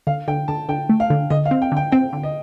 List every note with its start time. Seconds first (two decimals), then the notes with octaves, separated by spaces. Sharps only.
0.07 D3 F5
0.28 D3 G5
0.48 D3 A5
0.69 D3 G5
0.89 A3
1.00 F5
1.10 D3
1.30 D3 D#5
1.45 F5
1.51 C4
1.62 G5
1.72 D3 G5
1.92 C4 G5
2.13 D3
2.23 D#5